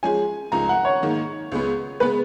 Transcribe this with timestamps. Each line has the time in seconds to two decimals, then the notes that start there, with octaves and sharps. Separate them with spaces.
0.03 F3 G#3 C#4 G#4 G#5
0.52 C#2 C#3 F3 G#3 D#4 A#5
0.69 F#5
0.85 C#5
1.02 G#2 D#3 A#3 D#4
1.52 C#2 C#3 G#3 B3
2.00 C#3 G#3 B3 B4